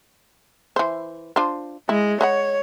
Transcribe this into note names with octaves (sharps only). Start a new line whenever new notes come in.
E3 C5
D4 F4 C5
G#3 E4
B4 C#5 D#5 F#5